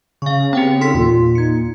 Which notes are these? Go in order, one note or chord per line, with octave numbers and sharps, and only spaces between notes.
C#3 F5 C#6
B3 C4 G4 F#5 G5
D#4 A4 C6 B6
E2 A#2 F4
D#4 G#6 C#7